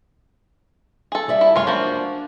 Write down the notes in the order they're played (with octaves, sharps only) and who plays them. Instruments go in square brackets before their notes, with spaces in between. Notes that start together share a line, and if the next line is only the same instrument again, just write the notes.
[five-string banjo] G#4 A4
[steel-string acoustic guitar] G3 D5 E5
[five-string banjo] E4
[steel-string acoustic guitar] F#2 G#3 [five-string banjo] F4 C#5
[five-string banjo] F3 A#3 F#4 [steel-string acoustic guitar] D4